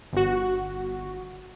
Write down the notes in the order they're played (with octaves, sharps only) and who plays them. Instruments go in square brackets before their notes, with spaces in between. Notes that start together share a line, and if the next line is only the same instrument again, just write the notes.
[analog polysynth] G1 F#4